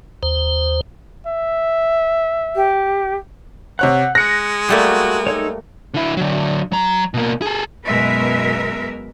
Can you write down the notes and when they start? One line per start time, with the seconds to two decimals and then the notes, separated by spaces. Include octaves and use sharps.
0.23 D#2 C5
1.27 E5
2.55 G4
3.79 C3 C#5 F#5 F#6
4.15 G#3 F#6 A#6 C#7
4.69 G3 A3 A#3 F#4
5.27 D#4 A4 C#5
5.94 D3 E4
6.17 D3 F#3
6.72 F#3 A#5
7.14 B2 A#3
7.42 G#4 A4
7.86 F#2 B2 G#3 A#4 B4 E5